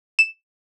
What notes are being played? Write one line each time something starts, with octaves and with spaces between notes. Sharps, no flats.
E7